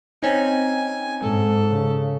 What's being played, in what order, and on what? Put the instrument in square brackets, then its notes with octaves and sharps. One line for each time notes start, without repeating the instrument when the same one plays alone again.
[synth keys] C4 C#4 D#4 [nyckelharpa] G#5
[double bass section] G#2 [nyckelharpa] A4
[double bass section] C#3